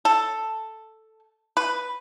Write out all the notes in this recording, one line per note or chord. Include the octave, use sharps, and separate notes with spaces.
A4
B4